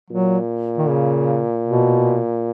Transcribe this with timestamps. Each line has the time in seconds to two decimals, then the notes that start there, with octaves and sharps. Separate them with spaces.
0.10 A#2 F#3
0.78 D#3
0.89 C#3
1.68 B2